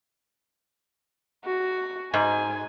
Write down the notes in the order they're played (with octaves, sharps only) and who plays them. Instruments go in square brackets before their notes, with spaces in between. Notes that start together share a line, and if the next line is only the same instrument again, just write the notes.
[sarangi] F#4
[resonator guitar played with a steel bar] G#2 [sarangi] G#5